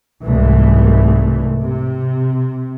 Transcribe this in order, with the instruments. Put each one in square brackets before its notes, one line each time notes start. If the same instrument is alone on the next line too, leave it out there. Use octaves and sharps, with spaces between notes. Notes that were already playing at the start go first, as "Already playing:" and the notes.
[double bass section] C2 G#2 E3 A3
C3